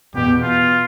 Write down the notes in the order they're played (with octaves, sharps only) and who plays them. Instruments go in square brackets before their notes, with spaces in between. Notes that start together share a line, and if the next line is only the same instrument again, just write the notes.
[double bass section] E2 B2 B3 [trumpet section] G4
[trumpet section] F4